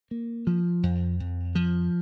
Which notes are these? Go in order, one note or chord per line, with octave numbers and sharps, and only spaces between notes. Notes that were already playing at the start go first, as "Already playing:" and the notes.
A#3
F3
F2
F2
F3